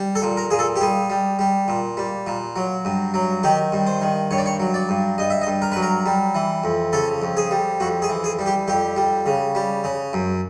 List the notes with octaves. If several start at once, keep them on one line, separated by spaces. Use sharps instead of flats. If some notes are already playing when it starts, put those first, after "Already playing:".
Already playing: G3
A4
A#2
A#4
A#2 G#4
A4
G4
G3 G#4
G3
G3
A#2
G3
A#2
F#3
G2
F#3
D#3 G4
G2
C5
D#3
G2 C#5
D5
C#5
F#3
D5
G2
G2 D#5
E5
D#5
G2
A#4
F#3 B4
A#4
G3
E3
F2
C#3 A4
F2
G#4
G3
F2 F#4
G#4
E3
G#4
G3
G4
F2 G4
G3
C#3
G3
C#3
F#2